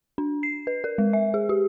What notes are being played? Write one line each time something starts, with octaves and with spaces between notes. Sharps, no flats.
D4
C7
B4
A#4
G#3
E5
G#4
G4